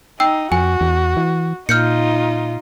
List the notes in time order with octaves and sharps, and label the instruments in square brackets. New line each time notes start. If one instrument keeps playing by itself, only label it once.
[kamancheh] D#4 [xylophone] G5 E6
[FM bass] F2 [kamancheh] F#4 [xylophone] G#5
[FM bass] E2
E3
[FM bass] A#2 [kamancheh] D#4 F4 [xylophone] F6 G6 C#7